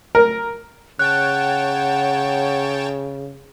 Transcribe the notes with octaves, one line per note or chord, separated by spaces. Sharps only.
A#4
C#3 C#5 F#5 G5 A5 F#6